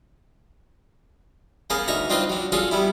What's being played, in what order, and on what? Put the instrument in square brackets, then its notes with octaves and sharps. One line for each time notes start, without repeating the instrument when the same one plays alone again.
[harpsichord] A#3 B3 C#4 G#4 F#5 A#5
D2 D#4 E5 A#5 C#6
C4 D4 D#4 F4 B4 C5
F#3 D4
C#4 F4 F#4 G#4 A4
G3 B3 E4